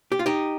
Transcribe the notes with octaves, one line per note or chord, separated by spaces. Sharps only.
G4
F4
D#4 G4